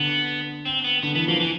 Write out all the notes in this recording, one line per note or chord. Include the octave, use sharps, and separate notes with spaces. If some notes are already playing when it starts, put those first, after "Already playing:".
Already playing: D3 B3
C4
B3
D3 B3
E3 B3
F3 A#3
E3